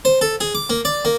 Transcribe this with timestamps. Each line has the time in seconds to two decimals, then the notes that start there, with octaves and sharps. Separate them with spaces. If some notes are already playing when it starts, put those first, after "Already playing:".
0.05 C5
0.21 A4
0.41 G#4
0.55 D6
0.70 A#3
0.85 D5
1.05 A#3